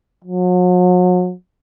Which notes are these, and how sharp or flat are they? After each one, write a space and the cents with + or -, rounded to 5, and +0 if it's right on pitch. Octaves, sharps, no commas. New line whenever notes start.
F#3 -40